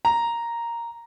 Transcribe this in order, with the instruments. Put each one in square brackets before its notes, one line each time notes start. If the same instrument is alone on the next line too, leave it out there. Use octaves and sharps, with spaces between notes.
[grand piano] A#5